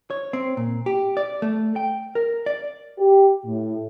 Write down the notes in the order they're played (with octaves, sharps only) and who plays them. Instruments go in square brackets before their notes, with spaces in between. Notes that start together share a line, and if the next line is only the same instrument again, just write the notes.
[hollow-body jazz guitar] C#5
C4
A#2
G4
D5
A3
G5
A#4
D5
[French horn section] G4
A2